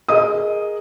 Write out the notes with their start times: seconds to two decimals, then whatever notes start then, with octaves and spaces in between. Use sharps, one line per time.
0.08 G#4 A#4 D#5 D#6